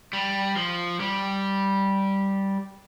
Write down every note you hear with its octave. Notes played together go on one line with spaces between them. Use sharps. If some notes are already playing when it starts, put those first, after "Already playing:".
G3
F3
G3